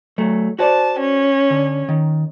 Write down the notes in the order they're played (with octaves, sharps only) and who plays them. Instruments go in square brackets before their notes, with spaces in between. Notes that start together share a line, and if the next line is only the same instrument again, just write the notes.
[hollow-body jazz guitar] F#3 A3
[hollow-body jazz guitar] F#4 C5 D5 [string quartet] A5
[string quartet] C#4
[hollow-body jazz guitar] D3
D#3